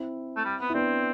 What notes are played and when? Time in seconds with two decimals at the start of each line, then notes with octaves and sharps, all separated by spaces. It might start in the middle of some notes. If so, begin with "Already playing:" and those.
Already playing: C4 E4
0.37 A3
0.45 G3
0.60 B3
0.70 E4
0.74 B3 C4 D4